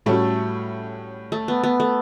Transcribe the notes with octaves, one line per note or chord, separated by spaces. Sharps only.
A2 G3 A3 C#4 F#4
A3
B3
B3
A3